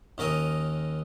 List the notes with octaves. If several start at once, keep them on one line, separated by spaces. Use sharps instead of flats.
D#2 C#4 A#4 D#5 D#6